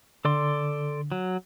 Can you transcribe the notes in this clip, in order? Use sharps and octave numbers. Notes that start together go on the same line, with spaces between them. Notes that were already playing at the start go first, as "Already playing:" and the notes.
D3 A4 D5 C6
F#3